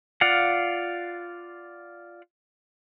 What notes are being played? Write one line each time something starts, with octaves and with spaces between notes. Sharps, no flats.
F4 D5 F5 F#5